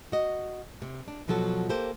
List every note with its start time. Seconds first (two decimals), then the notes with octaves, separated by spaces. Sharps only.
0.12 F#4 D#5
0.82 C3
1.08 D4
1.28 B2 F3 F#3 F#4 A4
1.69 A#3 G4 A4 C5